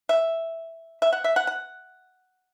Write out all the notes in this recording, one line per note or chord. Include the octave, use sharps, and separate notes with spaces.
E5
E5
F#5
E5
F#5
F#5